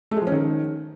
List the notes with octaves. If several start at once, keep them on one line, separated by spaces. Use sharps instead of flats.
A3
G#3
F3
C#4
D#3